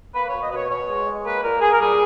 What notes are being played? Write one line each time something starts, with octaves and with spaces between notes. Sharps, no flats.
A#3 B4
B2 C#5
D#5
B2 B4 C#5
B2 C#5
G#3
G#3
A#3 B4
A#2 A#4
A#2 G#4
A#4
G3 G#4